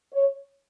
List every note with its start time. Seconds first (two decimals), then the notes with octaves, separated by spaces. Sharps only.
0.12 C#5